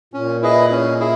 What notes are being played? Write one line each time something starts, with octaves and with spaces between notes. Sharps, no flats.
A#2 C#4
E4 G#4 B4 D#5
C#4
E4 G#4